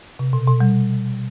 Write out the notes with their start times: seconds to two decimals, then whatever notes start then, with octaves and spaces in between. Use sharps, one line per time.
0.19 C3
0.33 B2
0.47 B2
0.60 G3